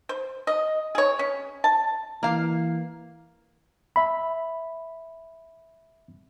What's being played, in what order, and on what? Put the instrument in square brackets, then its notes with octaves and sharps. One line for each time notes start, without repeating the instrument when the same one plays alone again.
[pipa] C5
D#5
G#4 C#5
C#4
A5
[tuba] E3 [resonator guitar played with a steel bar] A#3 F5
[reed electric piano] E5 B5